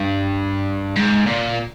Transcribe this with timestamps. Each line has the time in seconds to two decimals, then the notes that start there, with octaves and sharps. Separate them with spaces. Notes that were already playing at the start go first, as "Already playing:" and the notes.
Already playing: G2
0.96 G#2
1.27 A#2